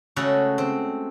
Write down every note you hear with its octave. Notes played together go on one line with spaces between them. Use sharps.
C#3 G#3 A3 F#4 A4
C4